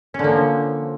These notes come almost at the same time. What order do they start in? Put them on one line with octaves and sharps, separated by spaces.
C#4 D3 A#3 F3